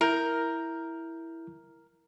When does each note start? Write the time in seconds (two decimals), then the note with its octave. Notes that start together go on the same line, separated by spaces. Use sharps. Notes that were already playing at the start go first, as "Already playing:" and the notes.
0.01 E4 A#4 G6